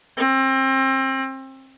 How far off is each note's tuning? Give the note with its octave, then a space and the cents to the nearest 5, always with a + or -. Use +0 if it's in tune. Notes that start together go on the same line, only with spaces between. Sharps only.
C4 +30